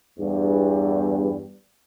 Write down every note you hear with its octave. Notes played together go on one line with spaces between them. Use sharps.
E2 G2